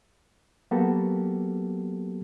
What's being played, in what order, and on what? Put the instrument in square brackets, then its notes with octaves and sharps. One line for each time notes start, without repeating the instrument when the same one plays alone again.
[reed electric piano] F#3 A#3 B3 F#4 G4 A4